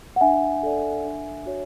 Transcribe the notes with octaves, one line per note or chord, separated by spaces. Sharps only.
F#5
D4 E5 G#5
A4 D5
D4
F#4 C#5